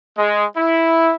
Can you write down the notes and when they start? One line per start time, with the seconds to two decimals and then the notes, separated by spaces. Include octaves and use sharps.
0.17 G#3
0.57 E4